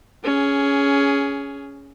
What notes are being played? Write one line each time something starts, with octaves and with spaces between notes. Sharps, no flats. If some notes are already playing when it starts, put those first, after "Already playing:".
C#4 G#4